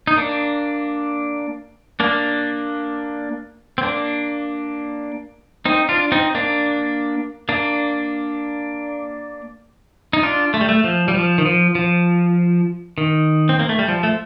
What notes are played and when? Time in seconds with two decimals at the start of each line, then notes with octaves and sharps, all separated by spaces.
0.07 D#4
0.17 A#3 D4
2.00 A#3 D4
3.78 C4
3.83 A#3 D4
5.65 C4 D#4
5.89 D4 F4
6.12 C4 D#4
6.35 A#3 D4
7.49 A#3 D4
10.13 D#4
10.23 D4 F4
10.54 A3
10.61 G3
10.69 A3
10.84 F3
11.08 G3
11.15 F3
11.38 D#3
11.45 F3
11.75 F3
12.98 D#3
13.49 C4
13.59 A#3
13.69 A3
13.79 G3
13.88 F3
14.03 A3